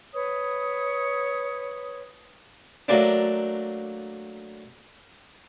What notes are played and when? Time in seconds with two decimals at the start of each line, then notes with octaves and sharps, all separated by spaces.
0.13 B4 C#5 D#6
2.88 F#3 A3 A#3 D4